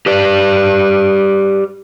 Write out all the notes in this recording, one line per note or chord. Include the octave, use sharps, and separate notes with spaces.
G4 B4 D5